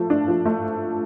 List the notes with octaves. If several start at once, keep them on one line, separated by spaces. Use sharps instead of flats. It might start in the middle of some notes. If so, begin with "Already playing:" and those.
Already playing: F3 A3
D4
F3
A3